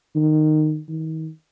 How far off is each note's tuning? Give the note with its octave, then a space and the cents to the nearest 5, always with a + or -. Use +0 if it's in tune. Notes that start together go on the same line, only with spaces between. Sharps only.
D#3 -15
D#3 +35